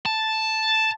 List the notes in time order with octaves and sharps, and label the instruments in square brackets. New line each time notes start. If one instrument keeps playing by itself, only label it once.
[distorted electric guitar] A5